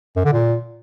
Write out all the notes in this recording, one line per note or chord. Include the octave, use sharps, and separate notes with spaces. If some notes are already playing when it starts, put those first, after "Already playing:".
F#2
D3
A#2